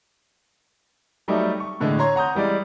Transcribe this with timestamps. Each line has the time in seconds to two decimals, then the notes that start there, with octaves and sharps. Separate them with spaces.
1.28 F#3 G3 A3 D#4 A4 D5
1.60 C#6
1.80 A2 D3 E3 G#3
1.99 C#5 A#5 C6 G#6
2.16 F#5 A#5 D#6 G6
2.35 E3 G3 G#3 D5